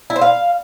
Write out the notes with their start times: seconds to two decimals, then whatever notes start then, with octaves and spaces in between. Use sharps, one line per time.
0.10 E4
0.16 C5
0.21 F5